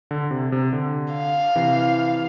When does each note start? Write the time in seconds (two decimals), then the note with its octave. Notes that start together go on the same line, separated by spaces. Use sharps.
0.11 D3
0.31 C3
0.52 C3
0.73 D3
1.14 F5
1.56 C3 E3